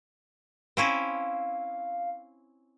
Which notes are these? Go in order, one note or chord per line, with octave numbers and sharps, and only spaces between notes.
C4 C#4 E4 F5